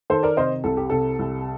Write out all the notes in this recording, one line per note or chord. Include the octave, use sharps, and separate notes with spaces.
D#3 A4 C5
A#4 D5
C3 C5 D#5
C2 A4
G4
C3 A4
C2